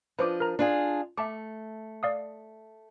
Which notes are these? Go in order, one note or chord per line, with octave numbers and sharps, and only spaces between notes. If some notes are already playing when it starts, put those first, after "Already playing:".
F3 D4 B4 C5 D#5 D6
A#4 A#5
D4 F4 G#4
A3 E5 A5 D6
D5 F5 D#6